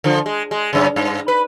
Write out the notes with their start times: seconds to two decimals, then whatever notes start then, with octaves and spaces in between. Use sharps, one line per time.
0.04 D3 F3
0.26 G#3
0.51 G#3
0.73 F#2 C#3
0.96 G2
1.28 B4